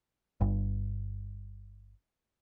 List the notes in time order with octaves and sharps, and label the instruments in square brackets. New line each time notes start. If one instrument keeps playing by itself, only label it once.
[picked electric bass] G1 G2